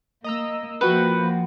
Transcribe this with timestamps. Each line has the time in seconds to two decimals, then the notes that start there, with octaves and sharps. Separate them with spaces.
0.24 A#3 D#5 A#5 E6
0.81 F3 A#3 F#4 B4 F#5 G5